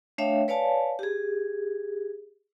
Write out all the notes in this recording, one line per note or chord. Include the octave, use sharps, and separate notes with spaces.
A3 D4 C#5 E5 F5 G5
B4 C#5 D5 F5 G#5 A5
G4 G#4